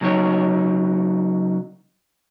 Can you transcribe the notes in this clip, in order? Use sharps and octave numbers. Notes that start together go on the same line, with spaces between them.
C#3 F#3 D#4 C#5